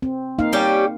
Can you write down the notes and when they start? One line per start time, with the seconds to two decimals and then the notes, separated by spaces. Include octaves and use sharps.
0.02 C4
0.38 A#3 D#4 F5
0.53 G3 C#4 G4